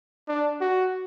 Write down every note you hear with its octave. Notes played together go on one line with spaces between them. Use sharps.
D4
F#4